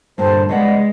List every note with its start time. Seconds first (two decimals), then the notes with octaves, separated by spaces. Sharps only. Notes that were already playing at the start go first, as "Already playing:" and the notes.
0.18 G2 A#2 D3 A4 C5 A5
0.49 C#3 G#3 B3 D5 D#5 F#5